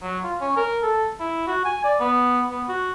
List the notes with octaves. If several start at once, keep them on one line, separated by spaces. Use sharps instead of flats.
F#3
F4
C#4
A#4
A4
E4
F#4
G#5
D5
B3
B3
F#4